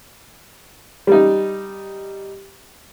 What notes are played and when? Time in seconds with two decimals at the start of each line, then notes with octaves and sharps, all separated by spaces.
1.07 G3 D#4